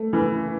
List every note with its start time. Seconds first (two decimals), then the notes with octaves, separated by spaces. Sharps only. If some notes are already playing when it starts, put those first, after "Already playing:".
Already playing: A3
0.13 E3